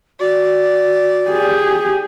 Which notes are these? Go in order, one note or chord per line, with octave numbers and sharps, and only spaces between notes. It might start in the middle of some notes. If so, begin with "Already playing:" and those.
F#4 D5
G4 G#4